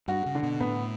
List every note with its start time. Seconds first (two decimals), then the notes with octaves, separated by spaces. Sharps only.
0.08 G2 F#4
0.26 C#3
0.35 D3
0.43 B2
0.60 A2 B3